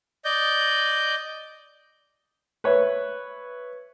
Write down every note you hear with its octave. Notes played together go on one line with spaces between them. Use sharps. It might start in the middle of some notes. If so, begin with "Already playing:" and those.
D5 D#5 G6
B4 C#5 E5